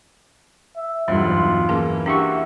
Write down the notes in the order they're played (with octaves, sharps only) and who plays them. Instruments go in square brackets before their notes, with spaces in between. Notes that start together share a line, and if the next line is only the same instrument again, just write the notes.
[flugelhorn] E5
[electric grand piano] B1 [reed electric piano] E2 G2 F#3 [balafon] E3 G3 [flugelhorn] F4
[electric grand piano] E3 A#3 [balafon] C#4 G#4
[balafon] D4 E4 [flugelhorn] F#4 [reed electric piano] G4 E5 C#6